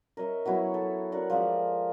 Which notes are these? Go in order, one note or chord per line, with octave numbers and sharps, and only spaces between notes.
A#4 C#5 D#5 E5
F#3 B3 E4 C#5
A4
F#4 A#4 D5 F#5
F3 G#3 D5 E5